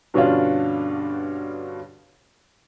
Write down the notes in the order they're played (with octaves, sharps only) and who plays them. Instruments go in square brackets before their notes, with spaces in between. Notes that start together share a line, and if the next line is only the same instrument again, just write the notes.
[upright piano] G2 B2 D3 C#4 D4 F4